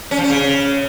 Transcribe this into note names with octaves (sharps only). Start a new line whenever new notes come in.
C#4
F3
C#4
C#3